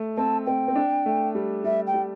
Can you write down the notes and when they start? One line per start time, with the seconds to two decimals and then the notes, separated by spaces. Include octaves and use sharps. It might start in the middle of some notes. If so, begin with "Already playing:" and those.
Already playing: A3
0.17 C4 A5
0.46 C4 G5
0.68 C4
0.76 D4
1.06 A3
1.35 G3
1.64 G3 E5
1.87 G5
1.94 G3